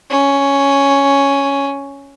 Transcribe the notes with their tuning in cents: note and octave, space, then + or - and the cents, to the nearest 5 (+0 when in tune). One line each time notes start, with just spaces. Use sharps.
C#4 +5